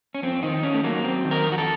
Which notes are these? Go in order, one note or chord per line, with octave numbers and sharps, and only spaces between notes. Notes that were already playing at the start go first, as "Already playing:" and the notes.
C#4
F2 C4
D#3 D#4
D#3 C#4
A3
F#3 A#3
F#3 C4
D#3
A#4
F2
F#4
A4